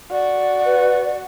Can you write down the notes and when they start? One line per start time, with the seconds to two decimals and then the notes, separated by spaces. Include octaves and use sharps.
0.11 F#4 D5
0.64 B4